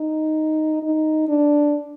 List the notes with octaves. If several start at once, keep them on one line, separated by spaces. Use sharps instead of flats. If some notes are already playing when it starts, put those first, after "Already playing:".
Already playing: D#4
D#4
D4